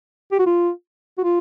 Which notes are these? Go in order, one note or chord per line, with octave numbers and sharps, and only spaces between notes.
G4
F#4
F4
F#4
F4